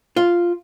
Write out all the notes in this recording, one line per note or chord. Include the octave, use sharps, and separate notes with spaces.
F4